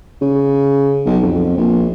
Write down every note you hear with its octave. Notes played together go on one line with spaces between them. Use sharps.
C#3
B1
F2
A#1